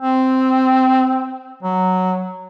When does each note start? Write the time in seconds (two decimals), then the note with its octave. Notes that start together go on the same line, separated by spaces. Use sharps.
0.01 C4
1.63 F#3